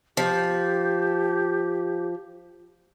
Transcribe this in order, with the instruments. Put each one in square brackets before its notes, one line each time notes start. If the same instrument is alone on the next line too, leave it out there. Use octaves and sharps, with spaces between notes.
[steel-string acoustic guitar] F3 [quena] G4